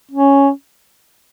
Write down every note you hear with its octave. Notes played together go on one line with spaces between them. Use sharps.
C#4